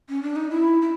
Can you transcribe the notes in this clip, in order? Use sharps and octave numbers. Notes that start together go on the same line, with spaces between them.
C#4
D4
D#4
E4
E4